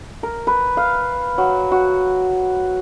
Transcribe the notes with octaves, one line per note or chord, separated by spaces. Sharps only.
A#4
B4
F5
F#3
F#4